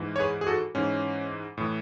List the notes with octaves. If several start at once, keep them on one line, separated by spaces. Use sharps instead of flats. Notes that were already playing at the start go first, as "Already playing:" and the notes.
Already playing: G#2 E3
C#5
G#4 B4
G#4
F#4 A4
G#2 E3 C#4
A2 E3